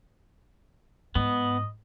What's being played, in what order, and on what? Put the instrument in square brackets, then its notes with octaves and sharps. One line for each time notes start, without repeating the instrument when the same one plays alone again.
[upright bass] G#2 [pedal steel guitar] B3 [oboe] D#5